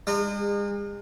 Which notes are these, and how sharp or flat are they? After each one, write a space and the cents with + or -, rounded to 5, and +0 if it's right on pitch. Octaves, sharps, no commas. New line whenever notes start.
G#3 -40 D#4 -45